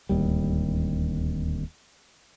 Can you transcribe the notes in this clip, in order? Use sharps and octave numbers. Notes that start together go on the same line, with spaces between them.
D1 D#2 G3